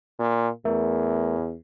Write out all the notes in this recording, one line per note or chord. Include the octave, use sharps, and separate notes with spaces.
A#2
E2 A3 A#4 E5